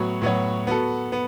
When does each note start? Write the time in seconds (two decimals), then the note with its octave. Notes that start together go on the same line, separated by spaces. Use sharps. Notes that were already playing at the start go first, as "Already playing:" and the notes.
Already playing: A2 F#3 B3 F#4 C#5
0.21 A2 F#3 B3 F#4 C#5
0.67 B3 F#4 A4
1.12 B3